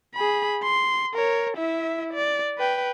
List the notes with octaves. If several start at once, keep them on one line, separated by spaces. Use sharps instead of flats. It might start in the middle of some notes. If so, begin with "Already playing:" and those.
G#4 B5
C6
A#4 C#5
E4 E5
D5
B4 G5